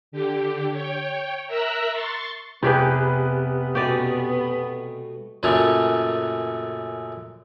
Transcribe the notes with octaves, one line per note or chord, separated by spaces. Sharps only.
D3 G4
C#5 G5
A#4 E5 A#5 E6 F#6
C6 C#6 A6
F1 C3 B3 G4 G#4 B4
B2 A3 C#4 G4 D5
F#2 A#2 C#3 F#3 A3 C#4